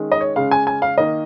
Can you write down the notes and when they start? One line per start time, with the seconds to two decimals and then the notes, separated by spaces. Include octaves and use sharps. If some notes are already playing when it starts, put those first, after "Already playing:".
Already playing: D#3 G#3 C#4
0.12 D#5
0.21 C#5
0.36 C#3 G#3 C#4 F5
0.51 G#5
0.67 G#5
0.82 F5
0.97 D#3 A#3 D#5